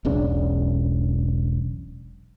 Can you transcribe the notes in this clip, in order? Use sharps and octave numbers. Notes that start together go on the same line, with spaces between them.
E1 B1 C#3 D4